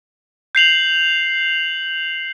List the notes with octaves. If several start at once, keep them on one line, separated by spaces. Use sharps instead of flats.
G6 C7 F7 F#7